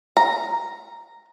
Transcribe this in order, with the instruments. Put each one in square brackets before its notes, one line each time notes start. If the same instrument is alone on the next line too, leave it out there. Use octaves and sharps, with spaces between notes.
[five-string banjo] A#5